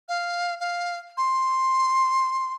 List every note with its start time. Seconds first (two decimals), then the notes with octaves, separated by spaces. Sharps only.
0.08 F5
0.60 F5
1.17 C6